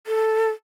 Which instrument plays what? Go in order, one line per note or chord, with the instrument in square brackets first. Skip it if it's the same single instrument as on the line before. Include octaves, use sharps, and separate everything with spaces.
[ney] A4